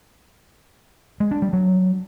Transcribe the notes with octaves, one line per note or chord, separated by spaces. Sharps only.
G#3
D4
G3
F#3